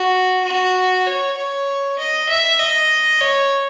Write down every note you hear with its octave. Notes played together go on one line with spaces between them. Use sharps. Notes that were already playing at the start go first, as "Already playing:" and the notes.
Already playing: F#4
F#4
C#5
C#5
D#5
E5
D#5
C#5